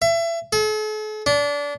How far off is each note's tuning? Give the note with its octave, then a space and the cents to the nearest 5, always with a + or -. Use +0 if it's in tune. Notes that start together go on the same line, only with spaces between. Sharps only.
E5 +30
A4 -45
D4 -25